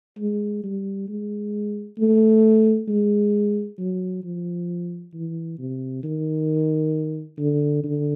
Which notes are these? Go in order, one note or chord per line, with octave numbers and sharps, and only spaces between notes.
G#3
G3
G#3
A3
G#3
F#3
F3
E3
C3
D#3
D3
D3